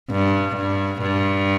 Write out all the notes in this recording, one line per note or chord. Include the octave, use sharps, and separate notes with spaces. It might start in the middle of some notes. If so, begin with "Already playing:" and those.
G2
G2
G2